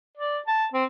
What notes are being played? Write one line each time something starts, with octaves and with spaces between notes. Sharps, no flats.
D5
A5
C4